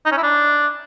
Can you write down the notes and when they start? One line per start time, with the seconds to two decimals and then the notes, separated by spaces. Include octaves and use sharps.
0.06 D#4
0.12 C#4
0.17 E4
0.23 D4